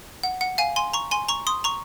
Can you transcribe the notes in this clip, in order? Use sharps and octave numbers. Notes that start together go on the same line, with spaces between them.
F#5
F#5
F5 G#5
G#5 C6
A#5 C#6
G#5 C6
A#5 C#6
C6 D#6
A#5 C#6